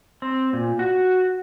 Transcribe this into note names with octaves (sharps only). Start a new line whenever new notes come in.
C4
A#2
F#4